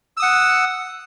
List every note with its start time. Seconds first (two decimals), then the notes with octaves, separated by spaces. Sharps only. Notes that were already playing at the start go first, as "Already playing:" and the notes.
0.17 E6
0.20 D#6
0.22 F#5